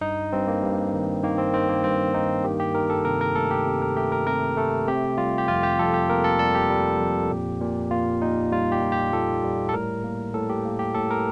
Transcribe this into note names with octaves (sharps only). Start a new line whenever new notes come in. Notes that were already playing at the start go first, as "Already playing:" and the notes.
G2 D#4
G2 C4
A#3
G2
D#3
D#3 A#3
C4
D#3 C4
A#3
G2 C4
A#3 D#4
D#3 G4
G4
D#3 A#4
A4
C3 A#4
A#4
A3 A4
G4
C3
A#4
A3 G4
A#4
C3 A#4
A3 A4
C3 G4
G3 F4
G4
F2 F4
G4
F2 A4
G4
A#3 A#4
A4
G3 A4
G4
G3
F2
A#2
A#2
A#3 F4
A#2 D#4
G3 F4
G4
A#2
G4
A#2 A4
G3
A4
A2 A#4
A#3
A2 A4
G4
A#3
G4
A2 A4
A#4